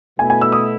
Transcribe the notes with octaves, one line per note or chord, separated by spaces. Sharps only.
B2 A3 E4 G#5
G#5
E6
D#6